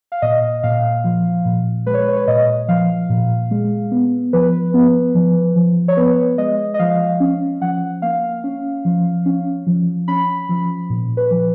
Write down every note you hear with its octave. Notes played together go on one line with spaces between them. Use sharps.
F5
A#2 D#5
A#2 F5
F3
A#2
G#3 B4
C#5
B4
C#5
B4
A#2 D#5
F3 F5
A#2
G#3
B3
F3 B4
B3
F3
F3
C#5
B3 B4
G#3 D#5
D#5
F3 F5
C#4
F3 F#5
A#3 F5
C#4
F3
C#4
F3
C#4 B5
F3
A#2
B4
F3